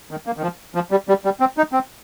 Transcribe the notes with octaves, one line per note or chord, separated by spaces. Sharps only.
D#3
A#3
D#3
F3
F3
G3
G3
G3
C4
D#4
C4